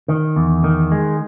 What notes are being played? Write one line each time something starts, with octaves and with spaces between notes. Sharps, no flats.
D#3
E2
D#3
G#3